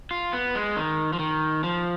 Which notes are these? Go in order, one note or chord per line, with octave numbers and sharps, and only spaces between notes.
F4
B3
G#3
D#3
F3
D#3
F3